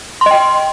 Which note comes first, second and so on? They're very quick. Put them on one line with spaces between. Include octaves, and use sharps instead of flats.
C6 D#5 G5